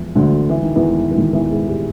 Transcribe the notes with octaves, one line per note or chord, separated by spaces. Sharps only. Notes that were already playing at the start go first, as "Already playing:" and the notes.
Already playing: E2 E3 F3
D2 D3
E3
D#3
E2 E3
E3
D#2 D#3
E2 E3
G#2 G#3
G3